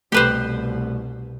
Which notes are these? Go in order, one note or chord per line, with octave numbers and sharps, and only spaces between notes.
C2 B2 A3 G4 B4 C5